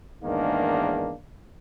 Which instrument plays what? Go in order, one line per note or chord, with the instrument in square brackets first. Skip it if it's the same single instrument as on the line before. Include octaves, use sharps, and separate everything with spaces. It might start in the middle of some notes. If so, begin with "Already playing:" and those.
[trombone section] E2 G#2 D#3 A#3 D4